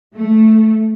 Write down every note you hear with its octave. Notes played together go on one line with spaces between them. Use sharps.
A3